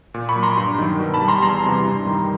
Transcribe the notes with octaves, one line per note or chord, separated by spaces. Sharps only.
A#2
B5 C#6
F#3
A#5 C6
G2
D#3 F#3
B2
A5 B5
G3
A#5 C6
E2 A#5 C6
C3 E3 G3
G2
D#3 G3